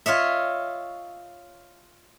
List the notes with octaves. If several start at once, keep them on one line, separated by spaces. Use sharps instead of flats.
F4 C#5 D#5 E5